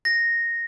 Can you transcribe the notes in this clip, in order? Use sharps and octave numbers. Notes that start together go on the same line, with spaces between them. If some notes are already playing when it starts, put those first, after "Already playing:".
A#6